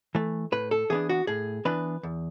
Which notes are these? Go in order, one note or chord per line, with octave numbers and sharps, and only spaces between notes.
E3 A3
A2 B4
A4
E3 B3 D4 G#4
F#4
A2 G#4
E3 B3 D4 B4
E2